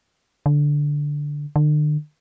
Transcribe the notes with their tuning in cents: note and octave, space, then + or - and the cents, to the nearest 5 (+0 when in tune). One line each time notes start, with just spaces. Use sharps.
D3 -5
D3 +40